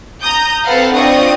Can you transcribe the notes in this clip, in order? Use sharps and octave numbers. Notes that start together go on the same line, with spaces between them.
A#5 D#6 G6
C4 A4 B4 F5 F#5
C4 D4 F4 D#5 C#6 D#6